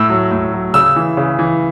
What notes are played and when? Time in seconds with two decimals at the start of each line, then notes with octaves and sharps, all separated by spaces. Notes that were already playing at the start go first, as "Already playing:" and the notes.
Already playing: A2 E6
0.09 F#3
0.31 A2
0.53 F#3
0.74 C#3 E6
0.96 E3
1.17 C#3
1.39 E3